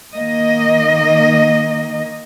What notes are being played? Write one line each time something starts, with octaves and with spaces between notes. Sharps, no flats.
D#3 A#3 D#5